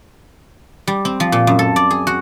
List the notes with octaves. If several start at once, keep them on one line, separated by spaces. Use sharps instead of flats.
G3
C4
F3
A#2
F#2
A4
D5
G#4
F#4